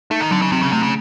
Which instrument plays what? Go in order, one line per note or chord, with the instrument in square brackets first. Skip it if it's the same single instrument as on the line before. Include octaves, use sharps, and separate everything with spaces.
[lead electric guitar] A3 [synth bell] D#4
[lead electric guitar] D#3
[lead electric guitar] D3 [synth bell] F#3
[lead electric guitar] C#3
[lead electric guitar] C3 [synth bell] C4
[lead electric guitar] C#3
[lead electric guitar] C3 [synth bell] A3
[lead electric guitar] C#3